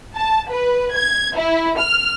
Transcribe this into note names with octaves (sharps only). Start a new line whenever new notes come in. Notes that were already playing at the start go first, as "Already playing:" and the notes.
A5
B4
G#6
E4
F6